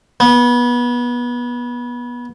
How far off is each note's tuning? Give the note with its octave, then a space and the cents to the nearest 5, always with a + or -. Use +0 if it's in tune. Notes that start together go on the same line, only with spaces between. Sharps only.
B3 -25